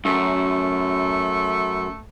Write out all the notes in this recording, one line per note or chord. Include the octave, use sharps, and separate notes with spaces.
F#2 A3